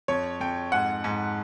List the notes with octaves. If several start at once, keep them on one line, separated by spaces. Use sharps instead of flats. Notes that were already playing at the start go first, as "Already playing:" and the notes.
F2 C#5
F2 G5
G#2 F#5
G#2